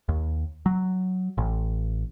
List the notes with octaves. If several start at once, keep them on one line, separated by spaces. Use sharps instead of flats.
D#2
F#3
A1